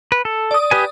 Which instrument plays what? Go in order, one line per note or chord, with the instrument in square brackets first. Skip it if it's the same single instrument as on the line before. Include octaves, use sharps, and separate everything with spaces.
[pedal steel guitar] B4
A4
[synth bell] D5 D#6
[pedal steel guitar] G4 B4 G#5